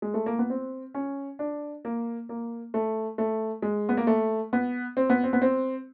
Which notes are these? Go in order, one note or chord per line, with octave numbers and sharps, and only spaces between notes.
G#3
A3
A#3
B3
C4
C#4
D4
A#3
A#3
A3
A3
G#3
B3
A#3
A3
B3
C4
B3
C4
B3
C4